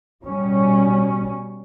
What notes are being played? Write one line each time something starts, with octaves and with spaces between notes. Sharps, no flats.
B2 G3 C#4